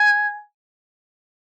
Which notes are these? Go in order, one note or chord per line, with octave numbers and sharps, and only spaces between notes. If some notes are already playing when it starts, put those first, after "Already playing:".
Already playing: G#5